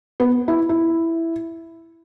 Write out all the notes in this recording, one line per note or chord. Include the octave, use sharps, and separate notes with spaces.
B3
E4
E4